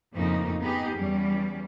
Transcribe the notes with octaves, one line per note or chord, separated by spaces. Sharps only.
F2 A2 C#3 A3 A#3 D#4
B3 D#4 G4 G#4
E2 G3 C#4